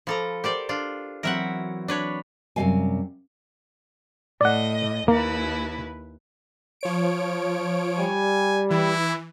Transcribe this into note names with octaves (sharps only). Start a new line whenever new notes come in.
F3 A4 A#5 B5 D6
G4 A#4 C5 D5
D4 F4
E3 F#3 C4 A#4 E5 F#5
D4 B4 C#5
F#2 C3 G3 A3 F5 G#5
A2 D5 D#5 F#5
D#2 A#3 E4 B4
F3 C#5 D7
G3 G#5
E3 E4